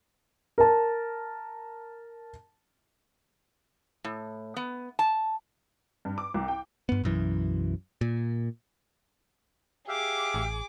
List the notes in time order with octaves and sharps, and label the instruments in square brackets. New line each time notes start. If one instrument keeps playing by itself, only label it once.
[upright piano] A#4 A5
[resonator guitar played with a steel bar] A2
B3
A5
[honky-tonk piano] G2
D6
C2
G5
[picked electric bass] G2 B3
B1 F#2 E3
A#2
[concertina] G4 E5 F5 [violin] G#4 D6
[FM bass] A1